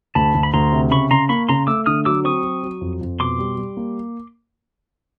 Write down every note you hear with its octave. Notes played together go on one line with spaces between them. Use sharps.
D2 A5 B5
D2
B5
D2 A#5 C6
C3
C#3 B5 C#6
C#3 A#5 C6
A#3 B5 C#6
C#3 A#5 C6
A3 D6 E6
D3 D#6 F6
F#3 D6 E6
C4 C#6 D#6
F#3
F#3
F2
F2
B2 C6 D6
G3
G3
A#3